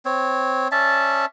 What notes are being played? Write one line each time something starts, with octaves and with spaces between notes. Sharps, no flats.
C4 C#5
C#4 D5 E5 A5